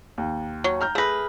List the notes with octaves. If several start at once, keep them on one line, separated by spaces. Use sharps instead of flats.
D#2
F#3
A#5 F6 G6
A3 G#4 B4 A#6